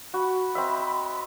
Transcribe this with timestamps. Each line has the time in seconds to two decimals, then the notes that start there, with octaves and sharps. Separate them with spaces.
0.14 F#4 B5
0.55 C4 D#5 E5